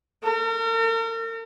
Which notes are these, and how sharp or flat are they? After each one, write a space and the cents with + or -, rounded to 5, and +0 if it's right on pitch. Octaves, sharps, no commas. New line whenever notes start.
A#4 -40